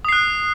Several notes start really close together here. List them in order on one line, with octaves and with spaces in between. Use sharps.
D#6 C7 F#6